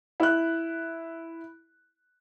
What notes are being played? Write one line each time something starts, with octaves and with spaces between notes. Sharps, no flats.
E4 F#6